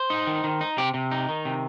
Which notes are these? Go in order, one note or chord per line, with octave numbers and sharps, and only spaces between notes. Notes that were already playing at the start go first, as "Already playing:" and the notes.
Already playing: C5
D#4
D#3
D#3
D#4
C3 G4
C3
D#4
D#3
C3